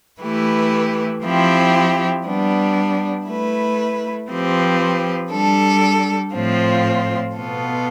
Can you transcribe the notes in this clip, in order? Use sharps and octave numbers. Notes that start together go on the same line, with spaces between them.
E3 A3 E4 G4 B4
F3 C4 E4 G4
G3 B3 D4
A3 E4 B4
F3 C4 G4 B4
G3 D4 A4
A2 F3 C4 F4
B2 B3 F4 A4